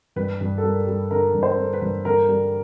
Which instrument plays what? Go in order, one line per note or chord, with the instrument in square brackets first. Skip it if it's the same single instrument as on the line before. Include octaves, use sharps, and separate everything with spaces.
[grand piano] G2 [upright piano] B4
[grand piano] G2
[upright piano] A4
[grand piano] G3 [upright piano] A#4
[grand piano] G3
[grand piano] D3 [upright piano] A#4
[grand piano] G2
[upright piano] C5
[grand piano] D3
[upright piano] B4
[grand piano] G2
[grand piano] D3 [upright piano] A#4
[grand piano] G3